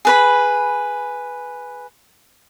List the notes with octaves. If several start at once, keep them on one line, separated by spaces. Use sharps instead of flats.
G#4 B4 B5